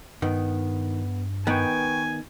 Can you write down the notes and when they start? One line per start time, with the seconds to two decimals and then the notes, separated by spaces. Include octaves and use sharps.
0.22 G2 D#3 B3
1.47 D#3 B3 B4 G5 G#5 C#6